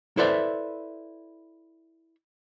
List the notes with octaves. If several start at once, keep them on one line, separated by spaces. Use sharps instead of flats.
E4 A4 B4 C5 D5 E5